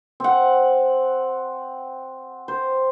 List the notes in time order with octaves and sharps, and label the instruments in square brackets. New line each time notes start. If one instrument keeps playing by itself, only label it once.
[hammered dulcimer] C4 F#5
C5